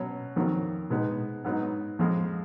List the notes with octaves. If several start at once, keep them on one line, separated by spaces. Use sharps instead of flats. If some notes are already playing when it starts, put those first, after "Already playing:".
Already playing: B2 F#3 C#4
F2 D#3 F#3
B2 G#3 B3 D#4
G#2 F#3 B3 D#4
F2 F3 G#3